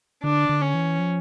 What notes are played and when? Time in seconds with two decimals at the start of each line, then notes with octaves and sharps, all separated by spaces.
0.23 D3 D4
0.49 D3
0.61 C#4
0.74 E3
0.99 F3